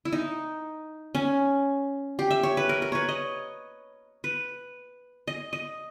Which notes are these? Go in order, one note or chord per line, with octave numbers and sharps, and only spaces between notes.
E4
D#4
C#4
G4
E5
C#5
B4
A#4
A#4
B4 C#5
D#5
B4
D#5
D#5